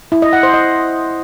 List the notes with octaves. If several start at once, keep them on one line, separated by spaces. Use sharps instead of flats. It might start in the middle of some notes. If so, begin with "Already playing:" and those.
E4
D#5
F#5
C5
D#5